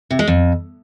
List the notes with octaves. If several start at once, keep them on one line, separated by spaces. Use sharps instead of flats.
C3
G#3
F2